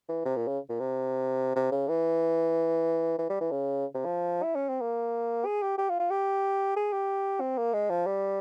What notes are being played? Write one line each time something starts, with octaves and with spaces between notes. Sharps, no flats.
E3
C3
A#2
C#3
A#2
C3
C3
C#3
E3
E3
G3
E3
C#3
C3
F3
E4
C#4
C4
A#3
G#4
G4
G4
F4
F4
G4
G#4
G4
C4
A#3
G#3
F3
G3